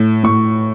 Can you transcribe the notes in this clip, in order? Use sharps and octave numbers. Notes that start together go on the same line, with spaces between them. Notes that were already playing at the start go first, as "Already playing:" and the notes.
Already playing: A2
A2 C#6